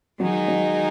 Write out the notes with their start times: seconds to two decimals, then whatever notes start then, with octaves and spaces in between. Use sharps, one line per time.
0.20 D#3 F#3 G#3 D#4
0.48 F#3